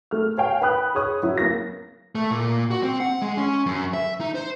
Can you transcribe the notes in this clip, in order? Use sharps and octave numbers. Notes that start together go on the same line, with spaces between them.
A3 F6
C#5 F5 G5 G#5
B4 G5 B5 D#6 F#6
G#4 C#5 D#6
F#2 F#3 E4
A#3 A#6
A3
A#2
F#4
C4
F#5
G#3
C#4
F#2
E5
D#4
C5